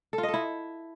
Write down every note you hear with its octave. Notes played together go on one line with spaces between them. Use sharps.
A4
F4
D#5
A4
E4